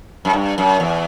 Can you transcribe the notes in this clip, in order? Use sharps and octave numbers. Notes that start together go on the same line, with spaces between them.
F#2
G2
F#2
E2